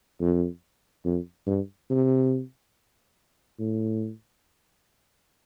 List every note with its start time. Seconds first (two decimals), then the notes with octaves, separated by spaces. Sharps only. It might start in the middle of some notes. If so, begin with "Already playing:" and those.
0.21 F2
1.05 F2
1.47 G2
1.90 C3
3.60 A2